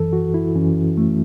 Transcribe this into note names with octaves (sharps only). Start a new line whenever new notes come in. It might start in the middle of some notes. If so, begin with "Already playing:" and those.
Already playing: F#2 E3 A4
F#4
E4
F#2 E3 C#4
A3